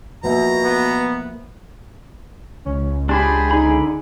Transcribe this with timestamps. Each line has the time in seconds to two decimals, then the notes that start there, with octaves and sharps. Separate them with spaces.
0.24 B2 F3 A#3 E5 A#5
0.65 B3
2.66 C#2 C#4
3.09 D4 G4 G#4 C5 B5
3.51 D3 D#4 B5